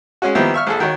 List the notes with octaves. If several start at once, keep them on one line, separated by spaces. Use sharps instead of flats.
G#3 C#4 F#4
D#3 F3 G3 A#3 B3 E4
E5 C#6 F6
A#1 G#4 A4
D#3 F#4 C#5